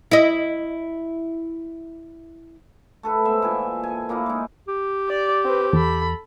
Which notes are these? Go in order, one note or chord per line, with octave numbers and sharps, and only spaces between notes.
E4 D#5
A3 A4 B4
G#3 B3 C5 E5
A#2 E3 G#5 A5
A4 G#5
A#2 A#3 D#4 E4
G#3 D#4
G4
D5
C4 B4
E2 A4 B5